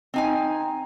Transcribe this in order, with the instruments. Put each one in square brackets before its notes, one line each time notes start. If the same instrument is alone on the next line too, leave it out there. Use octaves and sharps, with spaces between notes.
[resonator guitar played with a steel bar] C4 D#4 G#5